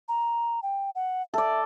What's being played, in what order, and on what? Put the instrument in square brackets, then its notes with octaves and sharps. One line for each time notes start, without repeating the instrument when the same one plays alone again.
[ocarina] A#5
G5
F#5
[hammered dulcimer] A4 D5 [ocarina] E5